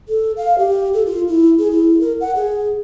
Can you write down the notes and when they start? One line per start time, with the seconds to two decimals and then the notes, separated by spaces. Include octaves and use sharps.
0.08 A4
0.37 F5
0.58 G4
0.94 A4
1.06 F4
1.28 E4
1.59 G#4
1.72 E4
2.01 A#4
2.21 F#5
2.36 G#4